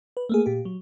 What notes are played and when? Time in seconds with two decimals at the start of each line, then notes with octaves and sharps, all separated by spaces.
0.17 B4
0.29 A3 A#3 G#4
0.46 A#2 G4
0.65 F#3